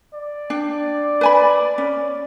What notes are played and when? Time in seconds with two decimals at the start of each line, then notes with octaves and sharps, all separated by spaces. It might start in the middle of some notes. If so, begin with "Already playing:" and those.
0.14 D5
0.50 D4 G5
1.21 B4 G#5 B5
1.78 C#4